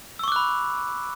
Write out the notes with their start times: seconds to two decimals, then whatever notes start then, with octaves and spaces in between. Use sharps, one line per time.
0.19 E6
0.24 C#6
0.28 D6
0.32 F#6
0.36 B5